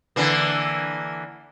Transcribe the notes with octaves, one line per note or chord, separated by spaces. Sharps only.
D3 E3 A#3